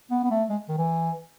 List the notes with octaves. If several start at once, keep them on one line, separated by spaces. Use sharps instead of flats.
B3
B3
A3
G#3
D#3
E3